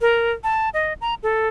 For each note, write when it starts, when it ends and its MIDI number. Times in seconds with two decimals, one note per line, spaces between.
0.01 0.32 70
0.44 0.69 81
0.74 0.93 75
1.01 1.14 82
1.23 1.48 69